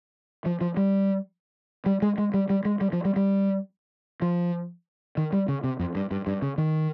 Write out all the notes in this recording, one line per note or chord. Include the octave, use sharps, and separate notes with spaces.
F3
F3
G3
G3
G#3
G#3
G3
G3
G#3
G3
F3
G3
G3
F3
D#3
G3
C#3
C3
F2
G2
G2
G2
C#3
D#3